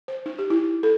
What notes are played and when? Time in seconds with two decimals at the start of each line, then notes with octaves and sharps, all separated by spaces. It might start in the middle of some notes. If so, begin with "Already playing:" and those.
0.08 C5
0.26 D#4
0.39 G4
0.50 E4
0.83 A4